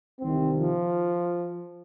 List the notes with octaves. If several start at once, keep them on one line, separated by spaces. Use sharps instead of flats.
C2 C3 D#3 C4
F3